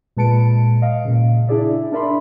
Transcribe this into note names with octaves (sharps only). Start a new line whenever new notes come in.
A#2 G#3 B4 A5 C#7 D7
D#5 F5
A#2 C#3
D4 E4 G#4 D5 E5
D4 A#4 D5 E5 B5 C6